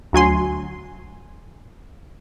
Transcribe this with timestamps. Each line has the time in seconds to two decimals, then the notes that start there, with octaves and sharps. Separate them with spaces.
0.13 D2 F#3 G#5 C6